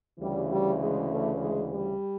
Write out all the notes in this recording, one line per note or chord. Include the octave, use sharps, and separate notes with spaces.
D2 C#3 E3 G3
G3
G#3
A3
G#3
G3